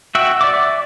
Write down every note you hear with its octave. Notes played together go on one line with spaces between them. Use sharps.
F#4 E5 F#5 G5 E6
D5 E5 D6